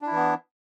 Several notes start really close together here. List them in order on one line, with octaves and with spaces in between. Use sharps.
D4 E4 E3 B3